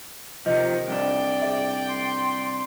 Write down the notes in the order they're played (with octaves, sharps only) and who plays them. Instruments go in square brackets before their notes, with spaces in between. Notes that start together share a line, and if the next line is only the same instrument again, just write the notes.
[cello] C3 D#3 [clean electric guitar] F3 [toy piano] D#5
[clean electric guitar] C2 D4 [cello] D5 G5
[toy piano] G#4 E5
[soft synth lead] C6